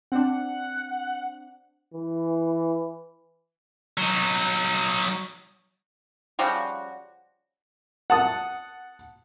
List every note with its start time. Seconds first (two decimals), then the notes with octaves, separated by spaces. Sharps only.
0.12 C4 D4 F#5
1.94 E3
3.98 F#3 D#4
6.39 C#3 F3 G3 F#4
8.10 F#5 A5 D#6